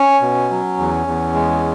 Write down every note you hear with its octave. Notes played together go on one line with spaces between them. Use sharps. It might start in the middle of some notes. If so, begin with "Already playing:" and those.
Already playing: C#4
B2
F#3
E2
E2
G#3